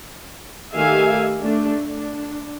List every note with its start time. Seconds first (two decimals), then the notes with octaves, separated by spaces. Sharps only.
0.75 D#3 A3 G4 E5 F5 G#5
1.41 A3 D4
1.86 D4